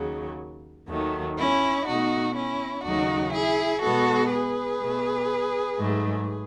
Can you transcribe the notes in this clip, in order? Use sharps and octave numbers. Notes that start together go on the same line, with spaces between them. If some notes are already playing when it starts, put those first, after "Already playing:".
Already playing: D#2 C#3 F#3
D#2 D#3 F#3 A3
C#4 E4
B2 A3 D#4 F#4
C#4 E4
D#2 C#3 F#3 A3 D#4 F#4
E4 G#4
B2 G#3 B3 F#4 A4
G#4 B4
B2 A3
G#2 F#3 A3